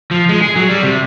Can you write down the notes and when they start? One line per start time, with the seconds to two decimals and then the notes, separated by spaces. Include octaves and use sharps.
0.11 F3
0.29 G#3
0.42 G#4
0.56 F#3
0.69 G3
0.83 C3